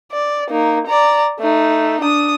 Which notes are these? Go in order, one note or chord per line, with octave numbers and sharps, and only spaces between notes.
D5
A#3 D#4
D5 A#5
A3 D#4
D4 D#6